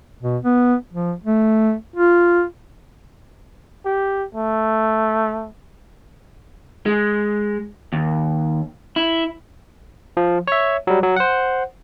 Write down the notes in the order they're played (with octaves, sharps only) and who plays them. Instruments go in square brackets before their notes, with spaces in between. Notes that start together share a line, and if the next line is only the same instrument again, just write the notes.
[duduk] B2
B3
F3
A3
F4
[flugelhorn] G4
A3
[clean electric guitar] G#3
D#2
E4
[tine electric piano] F3
C#5 E5
F#3 G3
F#3
C5 F#5